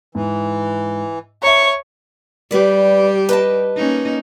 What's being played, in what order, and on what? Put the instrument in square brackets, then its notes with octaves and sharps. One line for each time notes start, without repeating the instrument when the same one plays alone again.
[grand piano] G#2 [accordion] E3
[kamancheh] C#5 [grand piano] E5 A#5 [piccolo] C#6
[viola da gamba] G3 G4 [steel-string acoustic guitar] B4 D5
[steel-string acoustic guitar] B4 D#5 A5
[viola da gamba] A#3 C#4 D#4